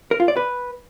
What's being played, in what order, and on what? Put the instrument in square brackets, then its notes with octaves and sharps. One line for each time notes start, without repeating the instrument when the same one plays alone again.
[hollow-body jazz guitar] A#4
F4
D5
B4